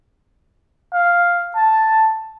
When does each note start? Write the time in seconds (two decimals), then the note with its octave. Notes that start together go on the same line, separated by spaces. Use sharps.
0.93 F5
1.56 A5